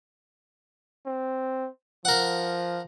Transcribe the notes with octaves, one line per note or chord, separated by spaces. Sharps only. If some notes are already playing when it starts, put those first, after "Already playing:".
C4
F3 A#4 F#5